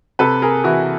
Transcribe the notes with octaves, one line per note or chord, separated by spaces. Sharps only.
C3 A4 B4
G#4 A#4
E3 E4 F#4